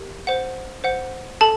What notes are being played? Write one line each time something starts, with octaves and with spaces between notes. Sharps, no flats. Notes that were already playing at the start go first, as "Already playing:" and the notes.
Already playing: G4 A#4
C5 F#5
C5 F#5
A4 A5